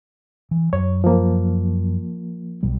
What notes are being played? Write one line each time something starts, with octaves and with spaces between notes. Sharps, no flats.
E3
F#2 F#3 C#5
F3 A#3
B1 B2 G3